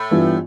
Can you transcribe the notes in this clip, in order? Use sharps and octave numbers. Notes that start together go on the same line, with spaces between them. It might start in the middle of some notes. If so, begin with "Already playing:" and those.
Already playing: A2 A3
G2 E3 B3 F4